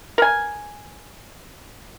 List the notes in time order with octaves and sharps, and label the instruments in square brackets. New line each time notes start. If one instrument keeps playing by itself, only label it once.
[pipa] A#4 G#5